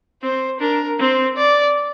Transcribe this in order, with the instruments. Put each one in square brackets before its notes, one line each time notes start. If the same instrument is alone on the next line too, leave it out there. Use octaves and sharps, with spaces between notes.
[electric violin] C4 [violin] C5
[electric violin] D4 [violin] A#4
[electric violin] C4 [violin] C5
[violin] D5